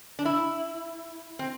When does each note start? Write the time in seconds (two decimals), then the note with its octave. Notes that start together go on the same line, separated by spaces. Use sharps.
0.19 D4
0.25 E4
1.39 C4